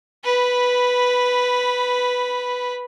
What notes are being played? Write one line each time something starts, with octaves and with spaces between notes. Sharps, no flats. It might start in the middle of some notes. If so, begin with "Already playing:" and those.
B4 B5